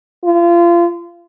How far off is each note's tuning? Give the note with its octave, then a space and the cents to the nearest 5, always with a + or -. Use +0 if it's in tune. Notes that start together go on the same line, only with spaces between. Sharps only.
F4 -30